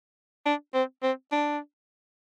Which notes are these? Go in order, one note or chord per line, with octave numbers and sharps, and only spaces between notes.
D4
C4
C4
D4